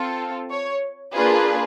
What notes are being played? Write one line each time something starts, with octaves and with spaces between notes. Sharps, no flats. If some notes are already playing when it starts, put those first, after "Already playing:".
Already playing: C4 F4 A4
C#5
A#3 D4 F4 G#4 B4